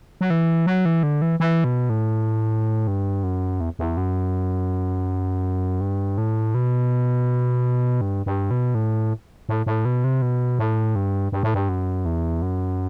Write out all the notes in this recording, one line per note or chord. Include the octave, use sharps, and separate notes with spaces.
F#3
E3
F#3
E3
D3
E3
E3
B2
A2
G2
F#2
E2
E2
F#2
G2
A2
B2
G2
G2
B2
A2
A2
A2
B2
C3
B2
A2
G2
G2
A2
G2
F#2
E2
F#2